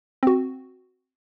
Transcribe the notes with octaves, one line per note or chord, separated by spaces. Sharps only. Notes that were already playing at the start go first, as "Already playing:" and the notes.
C4 F#4